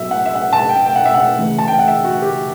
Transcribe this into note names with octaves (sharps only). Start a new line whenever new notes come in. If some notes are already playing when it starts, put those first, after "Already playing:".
Already playing: A2 F#3 B3 E5
F#5
E5
F#5
A5
G5
G5
F#5
E5
F#5
C#3 E3 A3
A5
G5
F#5
E5
F#4
G4